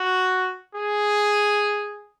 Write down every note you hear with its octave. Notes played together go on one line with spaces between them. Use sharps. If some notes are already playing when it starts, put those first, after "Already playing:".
Already playing: F#4
G#4